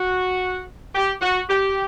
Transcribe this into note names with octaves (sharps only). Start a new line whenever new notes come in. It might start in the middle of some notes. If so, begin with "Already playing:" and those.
Already playing: F#4
G4
F#4
G4